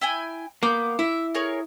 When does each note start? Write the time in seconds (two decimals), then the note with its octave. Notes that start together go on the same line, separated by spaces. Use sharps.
0.01 E4 G5 G#5
0.63 A#3 B3 D6 G6
0.99 E4 E5
1.35 G#4 A#4 C#5